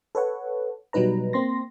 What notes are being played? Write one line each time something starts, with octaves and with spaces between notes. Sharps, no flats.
A4 B4 C#5 F#5
B2 F#3 G3 D#4 B4 A#5
A#3 C4 C6 A#6